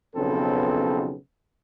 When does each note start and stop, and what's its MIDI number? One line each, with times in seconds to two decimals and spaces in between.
0.16 1.15 35
0.16 1.15 41
0.16 1.15 49
0.16 1.15 59
0.16 1.15 60
0.16 1.15 69